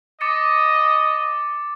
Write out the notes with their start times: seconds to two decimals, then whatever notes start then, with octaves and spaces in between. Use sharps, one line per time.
0.21 D#5 D6 A6 C#7